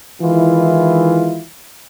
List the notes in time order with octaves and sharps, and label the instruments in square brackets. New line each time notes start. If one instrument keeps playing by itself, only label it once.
[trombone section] D#3 E3 G#3 E4 F4